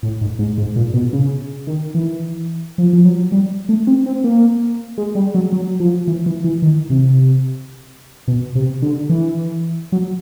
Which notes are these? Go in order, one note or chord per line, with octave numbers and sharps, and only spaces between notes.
A2
G#2
G#2
G#2
A#2
B2
C#3
D#3
E3
F3
F3
F#3
G3
A3
C4
C4
A#3
G#3
G3
F#3
F#3
F3
E3
E3
E3
D#3
C3
B2
C3
D3
E3
F#3